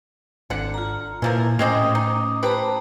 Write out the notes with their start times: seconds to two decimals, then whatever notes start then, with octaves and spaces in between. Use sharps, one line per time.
0.50 G#1 D3 F#5
0.74 F4 A#5
1.22 A#2 E3 F3 A#4
1.59 A2 G#3 C4 C#4 D#5 D6 D#6
1.95 D#4
2.43 G4 B4 C5 A5 A#5